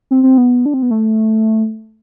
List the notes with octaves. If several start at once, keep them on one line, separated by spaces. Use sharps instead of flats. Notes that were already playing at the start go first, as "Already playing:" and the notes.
C4
C4
B3
D4
C4
B3
A3